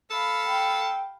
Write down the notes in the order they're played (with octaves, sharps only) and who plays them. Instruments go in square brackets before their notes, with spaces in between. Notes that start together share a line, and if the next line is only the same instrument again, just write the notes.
[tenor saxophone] A4 [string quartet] F5 B5
[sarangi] G5